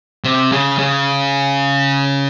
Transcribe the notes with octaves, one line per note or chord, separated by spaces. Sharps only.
C3
C#3
C#3